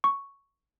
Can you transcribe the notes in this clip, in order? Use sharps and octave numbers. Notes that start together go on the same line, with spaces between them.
C#6